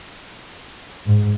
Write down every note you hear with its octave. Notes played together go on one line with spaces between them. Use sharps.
G#2